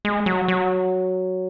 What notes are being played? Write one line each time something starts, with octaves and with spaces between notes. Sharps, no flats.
G#3
F#3
F#3